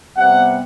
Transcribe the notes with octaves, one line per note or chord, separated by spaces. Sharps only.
C3 G3 B3 F#5